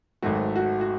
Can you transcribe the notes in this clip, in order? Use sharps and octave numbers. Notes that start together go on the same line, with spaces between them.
G#1 G#2 F#3 A3 F#4
F#4
F#4